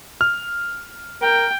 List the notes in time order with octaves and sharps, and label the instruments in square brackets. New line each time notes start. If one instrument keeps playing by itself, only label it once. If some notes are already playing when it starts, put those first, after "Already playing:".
[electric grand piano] F6
[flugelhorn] A#4 [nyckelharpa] G5